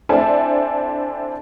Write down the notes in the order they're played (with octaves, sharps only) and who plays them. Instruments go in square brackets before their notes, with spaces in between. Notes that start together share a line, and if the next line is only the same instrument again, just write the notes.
[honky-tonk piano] C4 D4 E4 A4 E5 G#5